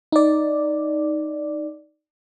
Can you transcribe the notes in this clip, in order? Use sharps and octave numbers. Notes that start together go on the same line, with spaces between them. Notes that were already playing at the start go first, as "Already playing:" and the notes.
D#4 D5